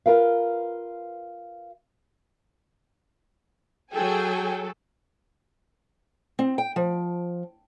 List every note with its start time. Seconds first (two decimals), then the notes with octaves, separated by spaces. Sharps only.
0.06 F4 A#4 B4 F5
3.93 F#3 G#4 A4 G5 G#5
6.39 C4
6.58 G5
6.76 F3